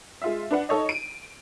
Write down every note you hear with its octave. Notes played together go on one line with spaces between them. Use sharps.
G#3 F4 E5
D4 B4 F#5
D#4 A4 C#5 D#5
D7 D#7